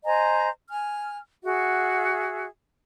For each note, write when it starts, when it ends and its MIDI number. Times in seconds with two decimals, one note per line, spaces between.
0.05 0.49 72
0.05 0.49 75
0.05 0.49 80
0.05 0.49 82
0.70 1.18 80
0.70 1.18 89
1.44 2.46 66
1.44 2.46 68
1.44 2.46 76
1.44 2.46 78